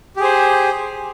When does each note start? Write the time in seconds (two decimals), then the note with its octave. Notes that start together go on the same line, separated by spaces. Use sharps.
0.16 G4
0.20 G#4
0.23 C5